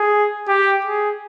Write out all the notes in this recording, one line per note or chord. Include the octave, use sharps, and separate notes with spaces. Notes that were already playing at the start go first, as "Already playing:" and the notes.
Already playing: G#4
G4
G#4